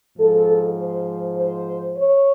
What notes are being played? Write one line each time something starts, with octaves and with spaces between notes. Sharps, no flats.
G#2 F3 A4
C5
C5
C#5